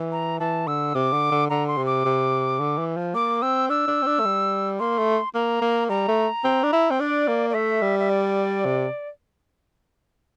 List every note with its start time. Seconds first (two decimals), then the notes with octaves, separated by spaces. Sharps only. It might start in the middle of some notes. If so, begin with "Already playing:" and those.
Already playing: E3
0.12 A#5
0.40 E3 A5
0.67 D3 E6
0.95 C3 D6
1.13 D3
1.32 D3
1.50 D3 A#5
1.68 C6
1.77 C3
1.86 D6
2.05 C3
2.60 D3
2.78 E3
2.96 F3
3.15 A#3 D6
3.42 C4 E6
3.70 D4 E6
3.88 D4
4.02 C4
4.07 D4
4.20 A3
4.25 G3
4.79 A#3 C6
4.99 A3
5.34 A#3 A#5
5.62 A#3
5.89 G3 A#5
6.08 A3
6.45 C4
6.64 D4
6.73 E4
6.91 C4
7.00 D4 D5
7.28 A#3
7.50 D5
7.54 A3 E5
7.82 G3
7.99 E5
8.10 D5
8.65 C3